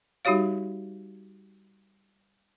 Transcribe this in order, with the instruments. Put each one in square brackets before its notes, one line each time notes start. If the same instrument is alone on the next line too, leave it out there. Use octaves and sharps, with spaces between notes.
[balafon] G3 D#4 F#4 G4 C#5 F5